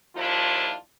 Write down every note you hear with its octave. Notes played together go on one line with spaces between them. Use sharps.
D#2 F3 D4 E4 F4